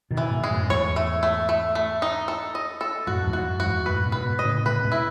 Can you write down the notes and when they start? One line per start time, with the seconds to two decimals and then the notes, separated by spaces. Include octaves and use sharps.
0.11 B2 D#3
0.17 E3
0.31 G#2 B2
0.44 G#3
0.50 F#2 A2
0.70 E2 G#2 C#5
0.96 A3
1.23 A3
1.49 A3
1.75 A3
2.02 D#4
2.28 A4
2.55 D#5
2.81 A4
3.07 F#2 A2 F#4
3.23 A2
3.26 E2 G#2
3.33 F#4
3.47 F#2
3.60 F#4
3.66 E2 G#2
3.86 F#2 A2 B4
4.06 G#2 B2
4.12 B4
4.25 G#2 B2
4.39 D#5
4.45 A2 C#3
4.65 A2 C#3 B4
4.84 G#2 B2
4.92 E4